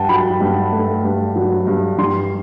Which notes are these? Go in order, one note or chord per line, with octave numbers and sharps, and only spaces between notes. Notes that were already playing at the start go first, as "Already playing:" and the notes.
Already playing: G2 F#5 G5 A5
F#3 B5
G2
A3
G2
F#3
G2
G3 C6